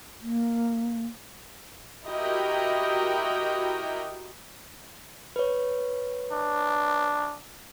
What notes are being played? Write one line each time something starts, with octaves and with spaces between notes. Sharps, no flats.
A#3
E4 F#4 G4 A#4 D#5 G5
B4 C#5
D4